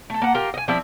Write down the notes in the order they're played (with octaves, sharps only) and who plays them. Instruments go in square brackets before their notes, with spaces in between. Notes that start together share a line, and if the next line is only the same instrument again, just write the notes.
[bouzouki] A3 A4
A#3 F#5
F4 G4 A#4
D#5 G#5
F3 G3 C4 E4